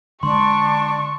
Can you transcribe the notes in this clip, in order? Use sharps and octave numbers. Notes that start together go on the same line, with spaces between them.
D3 G#3 D4 C6 C#6